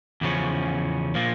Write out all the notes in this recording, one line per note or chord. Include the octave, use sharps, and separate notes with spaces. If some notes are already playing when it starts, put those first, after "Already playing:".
E2 C#3 F3 C#4
A#2 F3 A#3